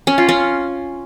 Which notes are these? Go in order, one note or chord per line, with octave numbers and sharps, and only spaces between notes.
C#4
F4
C#4